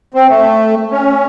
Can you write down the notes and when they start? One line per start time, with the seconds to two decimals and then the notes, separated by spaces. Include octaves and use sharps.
0.14 C4
0.29 A3
0.91 C#4